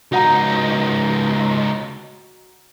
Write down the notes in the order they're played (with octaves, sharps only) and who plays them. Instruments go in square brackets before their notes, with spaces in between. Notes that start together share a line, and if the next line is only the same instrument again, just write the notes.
[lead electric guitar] C#2 D#4 [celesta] F#4 F#5 A#5